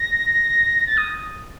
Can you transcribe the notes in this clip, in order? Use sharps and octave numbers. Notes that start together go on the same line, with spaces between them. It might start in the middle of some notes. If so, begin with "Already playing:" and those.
Already playing: A#6
A6
D#6